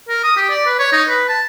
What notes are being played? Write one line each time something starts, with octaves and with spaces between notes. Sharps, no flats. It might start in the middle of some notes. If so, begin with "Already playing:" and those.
A#4
D#6
G4
D5
B4
C#5
D#4
B4
A5